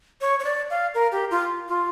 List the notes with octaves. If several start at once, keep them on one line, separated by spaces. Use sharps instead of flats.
C#5
C#5
D5
F5
A#4
G4
F4
F4